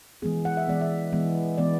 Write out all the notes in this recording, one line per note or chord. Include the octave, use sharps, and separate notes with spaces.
E3 G#3 B3 G#4
F#5
E5
E3 G#3 B3 D5
E5
E3 G#3 B3
E3 G#3 B3 D5